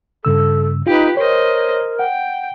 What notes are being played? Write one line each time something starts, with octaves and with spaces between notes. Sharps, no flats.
G2 C#3 A4 E6
D#4 F4 G4 B4
A#4 C5 C#5 D#5
F#5 G5